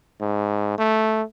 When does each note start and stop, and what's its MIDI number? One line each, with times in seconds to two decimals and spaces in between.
0.21 0.75 44
0.78 1.23 57